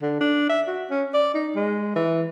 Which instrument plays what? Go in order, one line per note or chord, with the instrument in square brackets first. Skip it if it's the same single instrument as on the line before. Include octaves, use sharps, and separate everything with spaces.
[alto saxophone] D3
D4
E5
F#4
C#4
D5
D#4
G#3
E3